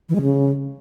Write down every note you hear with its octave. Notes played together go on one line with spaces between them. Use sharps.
E3
G#3
C#3